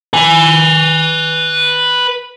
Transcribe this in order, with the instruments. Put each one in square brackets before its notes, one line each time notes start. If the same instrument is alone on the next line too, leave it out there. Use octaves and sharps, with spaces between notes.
[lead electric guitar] B4 G#5